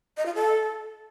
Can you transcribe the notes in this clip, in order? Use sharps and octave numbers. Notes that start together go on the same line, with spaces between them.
D#5
F4
A4